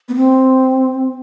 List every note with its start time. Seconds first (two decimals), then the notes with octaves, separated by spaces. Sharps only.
0.09 B3
0.16 C4